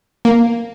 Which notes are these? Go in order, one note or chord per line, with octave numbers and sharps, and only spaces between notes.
A#3